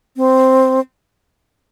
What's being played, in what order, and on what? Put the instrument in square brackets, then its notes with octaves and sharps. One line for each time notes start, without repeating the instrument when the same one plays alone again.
[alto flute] C4